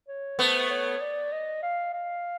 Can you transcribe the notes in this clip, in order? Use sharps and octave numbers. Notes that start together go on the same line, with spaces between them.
C#5
A3 B3 C5
C#5
D5
D#5
F5
F5